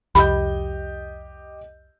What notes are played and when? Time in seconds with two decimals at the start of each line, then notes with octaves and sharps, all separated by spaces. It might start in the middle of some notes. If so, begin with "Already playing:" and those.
0.15 C2 F2 G4 D#5 B5 G6